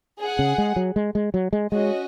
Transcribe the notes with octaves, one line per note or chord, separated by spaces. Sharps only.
G#4 F#5
C#3
G#3
F#3
G#3
G#3
F#3
G#3
G#3 C#4 F#4 D#5